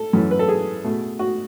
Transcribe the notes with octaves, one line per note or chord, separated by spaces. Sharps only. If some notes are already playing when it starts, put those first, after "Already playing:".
Already playing: A4
F#2 E3 A3
B4
A4
G#4
B2 A3
F#4